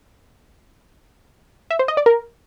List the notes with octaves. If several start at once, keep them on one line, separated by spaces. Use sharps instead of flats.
E5
C5
D#5
D5
A#4